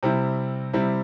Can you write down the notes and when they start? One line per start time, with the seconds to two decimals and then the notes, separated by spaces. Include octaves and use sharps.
0.03 C3 G3 C4 E4
0.73 C3 G3 C4 E4